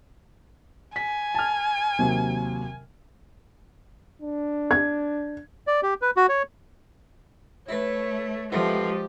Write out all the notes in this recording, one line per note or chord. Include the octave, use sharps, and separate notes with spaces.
G#5 B6
A5 F6
D#2 C3 F#3
D4
G#6
D5
G4
B4
F#4
C#5
A3 E4 B4 C#5
A1 F3 G#3 A3 B3 G4